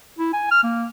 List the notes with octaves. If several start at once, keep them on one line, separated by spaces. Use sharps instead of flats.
E4
G#5
F6
A#3